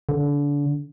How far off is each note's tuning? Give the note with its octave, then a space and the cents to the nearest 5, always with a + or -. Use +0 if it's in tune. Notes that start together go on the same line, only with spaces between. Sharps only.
D3 -30